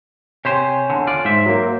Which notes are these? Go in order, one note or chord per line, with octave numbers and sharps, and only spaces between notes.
C3 G4 C5 C#5 G#5
E2 A#2 D3
F4 D5
G#2 C5 E5
F#3 A#3